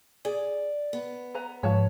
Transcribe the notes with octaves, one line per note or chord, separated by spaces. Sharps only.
G#4 D5
B3
B4 A#5
G#2 F3 C#5 A5